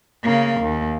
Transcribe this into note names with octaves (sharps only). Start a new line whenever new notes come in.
C#3 A#3
D#2